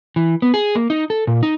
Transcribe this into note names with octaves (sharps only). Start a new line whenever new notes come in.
E3
B3
G#4
A#3
D#4
A4
A#2
D#4